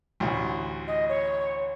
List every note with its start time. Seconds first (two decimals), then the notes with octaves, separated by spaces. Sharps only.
0.20 A1 D2
0.88 D#5
1.09 C#5